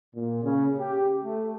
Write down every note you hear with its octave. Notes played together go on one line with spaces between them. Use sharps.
A#2
C#3
G4
A3